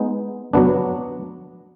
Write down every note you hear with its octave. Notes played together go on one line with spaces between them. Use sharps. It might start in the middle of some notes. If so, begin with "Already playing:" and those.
Already playing: G#3 B3 D#4
F#3 B3 D4